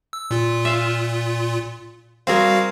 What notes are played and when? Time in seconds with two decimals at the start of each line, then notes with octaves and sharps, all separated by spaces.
0.13 E6
0.31 A#2 F4
0.65 E5 F5
2.27 G3 C4 F#4 G#4 A#4 F5